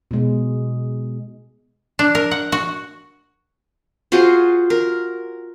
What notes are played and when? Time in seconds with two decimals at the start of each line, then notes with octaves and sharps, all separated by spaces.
0.11 B2 G#3
1.99 D4
2.15 A#4
2.31 F#5
2.52 F#4
4.12 F4 F#4 G#4 C5
4.70 A#4